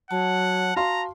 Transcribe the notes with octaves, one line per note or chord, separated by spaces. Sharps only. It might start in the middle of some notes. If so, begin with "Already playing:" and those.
F#3 F#5 A5
F#4 F5 A#5 C6